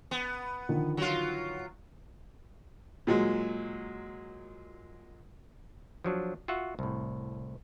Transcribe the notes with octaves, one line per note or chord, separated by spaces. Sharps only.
B3
D3 D#3 F3
F#3 F4
A#2 F#3 G#3
F3 F#3 D4
F4 F#4 E5 F#5
C2 A2